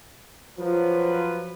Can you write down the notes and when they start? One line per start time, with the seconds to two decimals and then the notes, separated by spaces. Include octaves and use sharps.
0.59 F3 F#3 B4